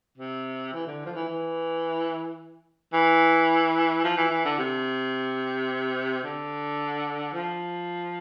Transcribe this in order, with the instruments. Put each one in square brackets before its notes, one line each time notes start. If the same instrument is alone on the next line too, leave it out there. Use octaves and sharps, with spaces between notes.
[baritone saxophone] C3
E3
D3
F3
E3
E3
E3
F3
E3
E3
D3
C3
D3
F3